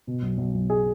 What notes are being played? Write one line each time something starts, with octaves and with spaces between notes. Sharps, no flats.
B2
B1
B1
B1
G#4